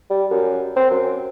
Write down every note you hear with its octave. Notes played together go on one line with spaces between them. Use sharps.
G3
F#2
C4
F#2